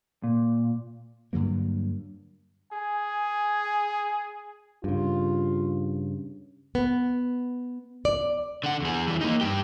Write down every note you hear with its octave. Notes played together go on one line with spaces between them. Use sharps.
A#2
G2 D3 F#3 A#3
G#4 G#5
G2 C#3 F4
B3
D5
D3 F#5
E2 G#4
E3 G3
A#3 D#4
G2 G4